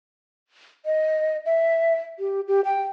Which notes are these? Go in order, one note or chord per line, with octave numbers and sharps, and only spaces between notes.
D#5
E5
G4
G4
G5